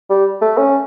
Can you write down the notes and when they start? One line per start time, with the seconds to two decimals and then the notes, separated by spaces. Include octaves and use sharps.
0.10 G3
0.41 A3
0.58 C#4